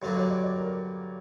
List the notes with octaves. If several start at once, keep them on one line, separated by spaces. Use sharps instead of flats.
G2 D3 F#3 A#3 D4 C#5
C#5
D5
D5
A#4